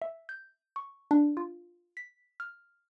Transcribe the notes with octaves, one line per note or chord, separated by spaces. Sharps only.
E5
G6
C#6
D4
F4
B6
F6